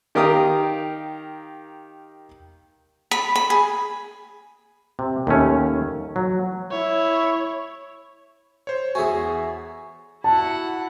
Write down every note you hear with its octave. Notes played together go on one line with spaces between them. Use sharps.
D#3 G4 A#4 F5 A#5 D#6
B5
B5
G#4
C3
D#2 A3 C#4
F#3
E4 C#5
C5 C#5
E2 F#4 G#4 E5 G#5
E4 F#4 F#5 A5